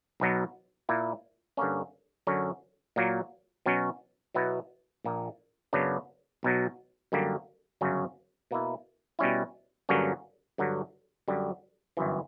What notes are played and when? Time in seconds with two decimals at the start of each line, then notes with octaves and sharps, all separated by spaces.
0.20 B1 B2 F#3 B3
0.89 A#2 A#3 E4
1.57 G2 D3 A#3 C#4
2.27 F#2 D3 F#3 C#4
2.96 A#2 F#3 A#3
3.66 B2 F#3 C#4
4.35 B2 F#3 B3 E4
5.05 A#1 A#2 A#3
5.73 F#2 C#3 F#3 B3 D4
6.43 B1 B2 F#3
7.12 F#2 D3 G3 A#3
7.81 G1 F#2 C#3 F#3 C#4
8.51 B2 A#3 E4
9.19 B2 G3 C#4 E4
9.89 G2 D3 F#3 A#3 C#4
10.58 G2 D3 F#3
11.28 F#2 D3 G3
11.97 G1 F#2 E3